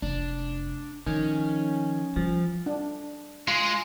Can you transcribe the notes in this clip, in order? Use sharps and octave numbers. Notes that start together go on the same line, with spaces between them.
F1 D4
D#3 F3 C#4
F3 G3
D4
G#3 F4 G#4